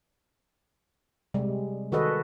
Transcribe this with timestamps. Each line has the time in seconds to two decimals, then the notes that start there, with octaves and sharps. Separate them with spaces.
1.34 C3 G3 G#3
1.92 D#3 F#4 G#4 A4 B4 D#5